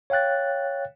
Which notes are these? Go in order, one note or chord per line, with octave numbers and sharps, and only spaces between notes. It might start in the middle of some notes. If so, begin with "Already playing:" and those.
C#5 F5 G5 F#6 A6